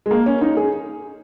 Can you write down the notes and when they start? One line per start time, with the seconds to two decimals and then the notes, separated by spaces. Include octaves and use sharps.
0.06 G#3
0.11 A#3
0.26 C#4
0.41 D#4
0.57 G#4